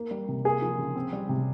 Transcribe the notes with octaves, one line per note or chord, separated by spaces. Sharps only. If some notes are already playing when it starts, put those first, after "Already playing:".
Already playing: A#3
G3
C3
A#3 G#4
F3
C#3
C4
G3
C3